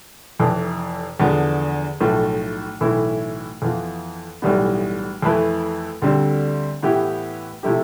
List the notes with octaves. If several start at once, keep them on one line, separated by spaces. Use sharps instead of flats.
F1 F2 E3
E2 D3 F3 B3
B1 A2 F3 A3
B1 A2 E3 A3 E4
F2 E3 B3 F4
B1 A2 E3 G3 B3
F2 E3 A3 E4 B4
D2 D3 G3 C4
A2 E3 B3 E4 G4
C3 F3 A3 E4 G4